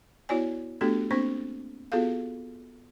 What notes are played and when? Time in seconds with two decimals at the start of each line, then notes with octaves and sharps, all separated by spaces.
0.29 B3 E4 F#4 C#5 D5 G#5
0.81 A3 B3 D4 F#4 G4 A4
1.11 A#3 C4 D4 C5 C#6
1.92 B3 F4 F#4 G#4 A4 F5